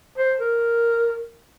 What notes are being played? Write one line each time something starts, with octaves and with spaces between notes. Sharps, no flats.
C5
A#4